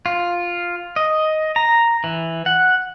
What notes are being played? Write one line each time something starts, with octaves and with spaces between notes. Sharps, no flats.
F4
D#5
A#5
E3
F#5